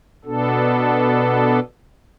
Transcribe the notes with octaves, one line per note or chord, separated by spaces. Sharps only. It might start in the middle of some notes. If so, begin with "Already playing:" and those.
B2 B3 D4 A4